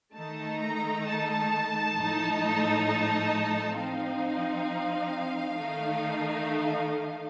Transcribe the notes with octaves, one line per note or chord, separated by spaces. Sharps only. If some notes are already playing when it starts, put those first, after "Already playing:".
D#3 A3 D#4 A5
A#5
A5
A2 F3 A3 D#4
A5
F3 C4 D#4 F5
D#3 A3 D#4